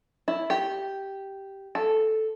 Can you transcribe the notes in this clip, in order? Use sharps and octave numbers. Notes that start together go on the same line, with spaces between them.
E4
G4
A4